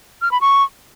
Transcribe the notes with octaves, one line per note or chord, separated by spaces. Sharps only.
F6
B5
C#6